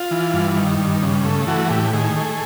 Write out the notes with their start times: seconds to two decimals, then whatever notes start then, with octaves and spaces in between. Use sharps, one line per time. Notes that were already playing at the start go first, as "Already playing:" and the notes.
Already playing: F4
0.11 E3
0.34 G2
0.57 D#3
0.78 G2
1.02 C#3
1.25 A3
1.47 E3 F#4
1.70 A2 G4
1.93 D#3 G#4
2.16 A3